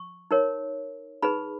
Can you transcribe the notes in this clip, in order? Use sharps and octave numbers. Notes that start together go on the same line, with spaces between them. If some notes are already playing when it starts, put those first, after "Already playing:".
Already playing: C#6
D#4 A#4 C#5
D#4 G#4 B4 B5